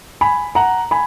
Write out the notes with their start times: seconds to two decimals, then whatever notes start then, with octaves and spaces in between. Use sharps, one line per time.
0.21 G#5 B5
0.55 F#5 A#5
0.91 G#5 B5